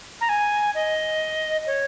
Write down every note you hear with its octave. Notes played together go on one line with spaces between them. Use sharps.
A#5
G#5
D#5
C#5